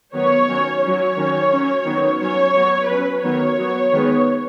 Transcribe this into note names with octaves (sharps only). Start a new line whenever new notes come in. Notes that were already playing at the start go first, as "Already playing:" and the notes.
D#3 F#3 B3 C#5
D#3 F#3 C#4
F#3 C#4 C#5
D#3 F#3 C#4
F#3 C#4
D#3 F#3 B3
F#3 C#4 C#5
F#3 B3
F#3 C#4 B4
D#3 F#3 B3 C#5
F#3 B3
D#3 G#3 B3